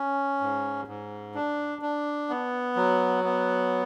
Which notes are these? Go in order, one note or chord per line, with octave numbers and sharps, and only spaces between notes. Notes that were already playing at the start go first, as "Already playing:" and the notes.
Already playing: C#4
G#2
G#2
D4
D4
B3
F#3
B3